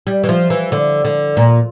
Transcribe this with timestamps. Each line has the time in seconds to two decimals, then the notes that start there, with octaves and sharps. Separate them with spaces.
0.07 G3
0.24 E3
0.29 F3
0.50 E3
0.72 D3
1.05 D3
1.37 A#2